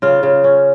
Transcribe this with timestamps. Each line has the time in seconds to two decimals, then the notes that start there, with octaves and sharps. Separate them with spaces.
0.02 C#3 F4
0.23 C#3
0.44 C#4